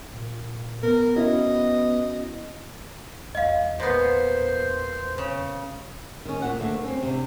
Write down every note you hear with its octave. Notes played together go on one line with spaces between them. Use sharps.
A#2
B3 A#4
C#4 E4 F#4 D#5
E2 G#3 D#5 F5
A#2 B3 C5
C#3
D#3 C#4
A#2 F#5
D2 A3 A#3 D4
C4 C#4
C3 D4